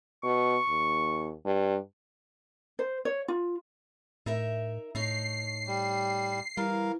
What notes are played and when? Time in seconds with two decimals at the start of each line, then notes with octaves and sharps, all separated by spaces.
0.24 B2 C#6
0.69 D#2
1.45 G2
2.79 C5
3.05 C#5
3.28 F4
4.26 A2 D#4 A#4 E5
4.95 A2 A3 D#4 C#5 C7
5.67 G3
6.57 E3 G3 A#4 F5